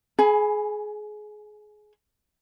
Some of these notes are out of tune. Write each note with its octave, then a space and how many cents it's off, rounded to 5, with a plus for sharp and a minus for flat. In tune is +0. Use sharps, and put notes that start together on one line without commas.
G#4 +25 G#5 +0 B5 +0